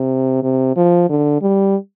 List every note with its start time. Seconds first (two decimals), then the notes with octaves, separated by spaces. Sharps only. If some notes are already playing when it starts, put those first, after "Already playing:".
Already playing: C3
0.43 C3
0.76 F3
1.09 D3
1.41 G3